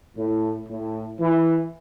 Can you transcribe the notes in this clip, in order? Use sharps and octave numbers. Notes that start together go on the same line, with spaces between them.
A2
A2
E3